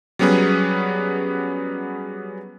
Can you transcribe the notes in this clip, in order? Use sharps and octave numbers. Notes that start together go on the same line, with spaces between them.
F#3 G3 B3 C#4 G#4 B4